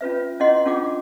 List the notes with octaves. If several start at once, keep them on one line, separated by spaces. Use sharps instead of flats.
C#4 F4 B4 E5
C#4 E4 G#4 D#5 F#5 C6
C#4 D4 F4 G#4 F#5 D6